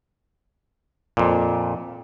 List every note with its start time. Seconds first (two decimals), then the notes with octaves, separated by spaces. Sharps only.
1.17 F2 A#2